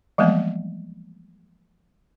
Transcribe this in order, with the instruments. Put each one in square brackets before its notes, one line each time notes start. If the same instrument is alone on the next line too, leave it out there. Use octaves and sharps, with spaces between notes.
[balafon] E3 F3 G3 G#3 A#3 B3